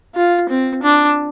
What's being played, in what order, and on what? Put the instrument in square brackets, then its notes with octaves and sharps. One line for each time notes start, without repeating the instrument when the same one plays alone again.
[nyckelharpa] F4
C4
D4